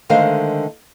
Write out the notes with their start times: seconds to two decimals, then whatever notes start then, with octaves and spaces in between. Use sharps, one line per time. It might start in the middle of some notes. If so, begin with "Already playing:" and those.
0.09 D3 D#3 G#3 A3 C5 F5